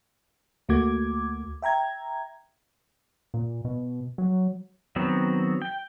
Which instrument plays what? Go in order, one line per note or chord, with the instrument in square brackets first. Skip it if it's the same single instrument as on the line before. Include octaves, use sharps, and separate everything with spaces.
[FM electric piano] D2 A3 A#3 F#4 D6 G#6
E5 G5 A#5 G#6
[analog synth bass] A#2
B2
F#3
[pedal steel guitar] D#3 F#3 B3 C4
G5